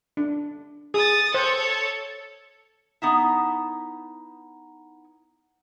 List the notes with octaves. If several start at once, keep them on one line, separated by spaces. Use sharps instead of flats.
D4
G#4 D#6 A6
A4 C5 C#5
B3 D#4 E4